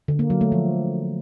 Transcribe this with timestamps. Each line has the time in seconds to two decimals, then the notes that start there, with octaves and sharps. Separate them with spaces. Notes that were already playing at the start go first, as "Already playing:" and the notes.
0.08 D3
0.19 A#3
0.30 F#3
0.41 A3
0.52 F3